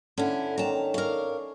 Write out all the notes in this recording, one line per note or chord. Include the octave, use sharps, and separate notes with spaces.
D3 C#4 E4
D#3 C#4 A5 A#5
A#4 C#5 D5 F5